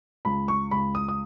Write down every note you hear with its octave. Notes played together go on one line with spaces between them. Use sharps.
C#2 B5
C#6
C#2 B5
D#6
D#6